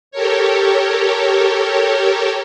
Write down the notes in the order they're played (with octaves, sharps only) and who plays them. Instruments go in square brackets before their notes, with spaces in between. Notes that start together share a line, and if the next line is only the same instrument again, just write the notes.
[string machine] G4 A4 A#4 C#5